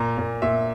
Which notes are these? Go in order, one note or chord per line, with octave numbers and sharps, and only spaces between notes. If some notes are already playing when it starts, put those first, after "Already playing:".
Already playing: A#2 A#5
A#2
A#2 E5